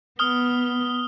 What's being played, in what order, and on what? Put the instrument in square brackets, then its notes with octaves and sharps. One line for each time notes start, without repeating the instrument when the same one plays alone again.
[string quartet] B3 [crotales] D#6 F6 G7